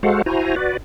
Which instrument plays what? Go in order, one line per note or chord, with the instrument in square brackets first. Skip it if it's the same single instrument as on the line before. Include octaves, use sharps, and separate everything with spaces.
[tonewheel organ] G#3 F#4 A4 C5 F5 F#5
E4 F#4 C5 G#5 A#5
F#4 B4 D5